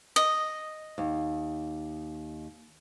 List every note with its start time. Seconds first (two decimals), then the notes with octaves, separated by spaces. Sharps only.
0.16 D#5
0.98 D#2